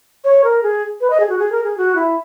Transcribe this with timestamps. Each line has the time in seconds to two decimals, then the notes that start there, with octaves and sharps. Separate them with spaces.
0.24 C#5
0.44 A#4
0.63 G#4
1.01 B4
1.10 D#5
1.20 G#4
1.29 F#4
1.39 G#4
1.52 A#4
1.64 G#4
1.78 F#4
1.95 E4